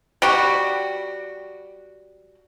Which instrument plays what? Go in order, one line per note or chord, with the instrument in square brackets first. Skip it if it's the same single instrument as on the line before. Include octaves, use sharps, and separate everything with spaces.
[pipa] G3 F#4